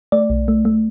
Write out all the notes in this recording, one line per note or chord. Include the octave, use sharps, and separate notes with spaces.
A3 D5
B1
A3
A3